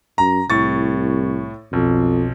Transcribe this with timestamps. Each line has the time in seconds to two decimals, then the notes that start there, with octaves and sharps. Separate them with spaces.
0.18 F#2 A#5
0.50 C2 A2 C#6 A6
1.73 B1 F2